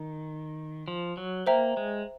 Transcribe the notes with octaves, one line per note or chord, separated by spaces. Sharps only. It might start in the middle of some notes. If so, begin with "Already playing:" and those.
Already playing: D#3
F3
F#3
A#3 C5 E5 G5 A#5
G#3